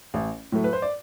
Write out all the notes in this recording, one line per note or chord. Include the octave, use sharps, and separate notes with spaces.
A1
A2 F#3 A3
B4
C5
D5